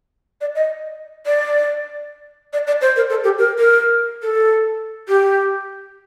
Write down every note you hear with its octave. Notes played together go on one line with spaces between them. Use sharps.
D5
D#5
D5
D5
D5
C5
A#4
A4
G4
A#4
A#4
A4
G4